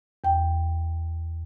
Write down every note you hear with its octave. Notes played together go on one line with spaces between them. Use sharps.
E2 G5